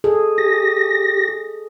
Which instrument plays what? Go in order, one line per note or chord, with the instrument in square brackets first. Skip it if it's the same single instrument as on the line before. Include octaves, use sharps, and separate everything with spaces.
[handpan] G#4 A4
[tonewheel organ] G4 A#6